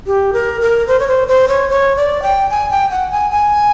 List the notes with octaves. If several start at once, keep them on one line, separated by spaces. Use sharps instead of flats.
G4
A#4
A#4
C5
C#5
C5
C5
C#5
C#5
D5
G5
G#5
G5
F#5
G#5
G#5